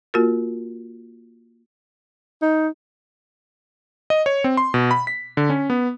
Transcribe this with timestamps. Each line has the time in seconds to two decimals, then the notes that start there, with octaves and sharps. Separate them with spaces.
0.14 A#3 F4 F#4 A#4
2.42 D#4
4.10 D#5
4.26 C#5
4.44 C4
4.57 C6
4.74 B2
4.91 B5
5.07 B6
5.37 D3
5.50 C#4
5.70 B3